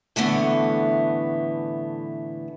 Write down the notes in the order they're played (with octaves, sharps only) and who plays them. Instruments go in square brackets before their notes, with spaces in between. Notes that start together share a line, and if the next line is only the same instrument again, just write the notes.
[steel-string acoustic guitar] A2 D3 E3 A3 B3